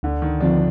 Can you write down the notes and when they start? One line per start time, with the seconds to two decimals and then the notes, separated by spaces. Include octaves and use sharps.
0.03 D2 D3
0.22 D#3
0.40 D3 F3 C4 D4 F4